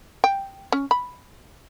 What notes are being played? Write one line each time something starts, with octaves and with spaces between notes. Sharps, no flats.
G5
C#4
B5